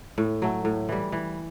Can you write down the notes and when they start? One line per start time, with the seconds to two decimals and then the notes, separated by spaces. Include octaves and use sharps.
0.18 A2
0.42 F#3 A3
0.65 A2
0.89 E3 G3
1.12 E3